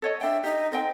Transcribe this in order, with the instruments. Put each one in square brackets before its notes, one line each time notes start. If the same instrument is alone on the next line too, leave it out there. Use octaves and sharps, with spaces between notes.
[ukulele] A4 C#5 D#5
[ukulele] D4 G5 [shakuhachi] E5
[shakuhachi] D#4 [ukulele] G4
[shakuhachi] C4 [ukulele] A4 D#5 G5